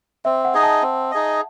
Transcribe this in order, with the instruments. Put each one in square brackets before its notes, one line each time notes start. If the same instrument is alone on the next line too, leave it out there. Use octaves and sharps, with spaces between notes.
[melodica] C4 [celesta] E5
[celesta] F#5
[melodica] D#4 G#4 D#5
[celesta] A5
[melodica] C4
D#4 G#4 D#5